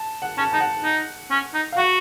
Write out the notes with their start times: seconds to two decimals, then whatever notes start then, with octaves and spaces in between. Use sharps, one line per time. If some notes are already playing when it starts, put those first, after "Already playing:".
Already playing: A5
0.22 F#5
0.38 C#4 A5
0.52 D#4 A5
0.60 F#5
0.84 D#4
1.31 C#4
1.54 D#4
1.72 F5
1.77 F#4 F#5